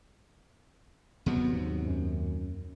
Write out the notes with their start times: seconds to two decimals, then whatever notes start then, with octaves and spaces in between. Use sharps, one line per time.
1.26 D#2 C3 F#3 B3
1.53 G#2
1.87 F#2